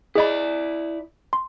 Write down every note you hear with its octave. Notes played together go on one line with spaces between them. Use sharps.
E4 G#4 D5 D#5 B5
C6